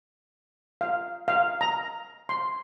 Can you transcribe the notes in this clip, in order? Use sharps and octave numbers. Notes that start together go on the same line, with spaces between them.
F5
F5
A#5
C6